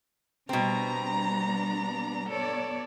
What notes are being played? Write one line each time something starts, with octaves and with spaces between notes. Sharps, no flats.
B2 G3 B3 C4 D4 A#5
B3 A4 C#5 D5